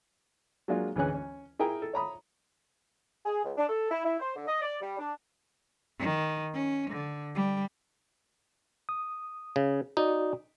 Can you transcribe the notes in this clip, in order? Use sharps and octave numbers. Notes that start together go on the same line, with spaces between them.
F#3 G#3 A#3 D4 F4 F#4
D2 E3 G#3 C#4 F#6
C#4
E4 G#4 A#4 G5 A#5
A4
C#5 A#5 B5 D#6
G#4
C#2
D4
A4
E4
E4
C5
D3
D#5
D5
G3
D4
D#3
C#4
D3
G3
D#6
C#3
D#4 F#4 D5